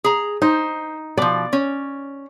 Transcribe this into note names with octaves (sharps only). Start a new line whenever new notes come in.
G#4 A#5
D#4 C5
B2 F3 D5
C#4